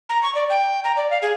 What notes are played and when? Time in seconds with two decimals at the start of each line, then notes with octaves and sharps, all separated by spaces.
0.09 A#5
0.23 C#6
0.35 D5
0.50 G5
0.84 A#5
0.97 D5
1.11 F5
1.22 G#4